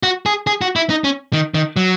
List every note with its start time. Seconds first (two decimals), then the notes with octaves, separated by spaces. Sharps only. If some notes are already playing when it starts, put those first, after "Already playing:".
0.03 F#4
0.26 G#4
0.47 G#4
0.61 F#4
0.76 E4
0.90 D#4
1.04 C#4
1.33 D#3
1.54 D#3
1.76 F#3